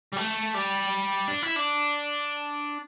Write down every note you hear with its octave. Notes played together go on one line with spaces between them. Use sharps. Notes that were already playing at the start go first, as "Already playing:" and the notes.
G3
A3
G3
D4
E4
D4